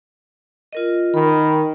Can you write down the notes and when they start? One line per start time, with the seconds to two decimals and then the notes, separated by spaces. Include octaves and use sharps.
0.73 F4 A#4 D#5
1.14 D#3 B5